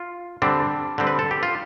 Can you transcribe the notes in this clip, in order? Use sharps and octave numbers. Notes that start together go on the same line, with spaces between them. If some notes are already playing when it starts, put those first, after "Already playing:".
Already playing: F4
D3 G3 C4 D4
D3 G3 C4
B4
A4
G4
F4